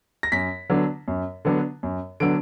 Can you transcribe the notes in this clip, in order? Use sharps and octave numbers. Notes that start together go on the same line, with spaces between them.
A#6
F#2 B6
D3 F#3 B3 D4
F#2
D3 F#3 B3 D4
F#2
D3 F#3 B3 D4 D7